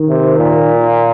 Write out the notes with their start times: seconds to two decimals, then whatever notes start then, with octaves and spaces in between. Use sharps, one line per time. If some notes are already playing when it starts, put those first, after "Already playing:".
Already playing: D#3
0.09 C3
0.37 A#2